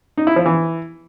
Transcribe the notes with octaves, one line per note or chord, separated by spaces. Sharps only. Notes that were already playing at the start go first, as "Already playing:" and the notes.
D#4
E4
F3
E3